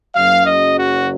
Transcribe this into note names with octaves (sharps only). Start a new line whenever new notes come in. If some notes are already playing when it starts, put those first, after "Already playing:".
F#1 F#2 C#3 F#3 F5
D#5
F#4